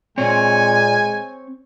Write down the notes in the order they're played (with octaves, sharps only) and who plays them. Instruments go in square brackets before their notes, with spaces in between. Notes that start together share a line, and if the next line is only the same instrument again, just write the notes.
[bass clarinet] A#2 [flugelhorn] G#3 [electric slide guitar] C4 C#5 [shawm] G#5